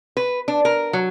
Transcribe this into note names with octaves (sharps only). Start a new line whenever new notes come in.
B4
D4
A#4
F#3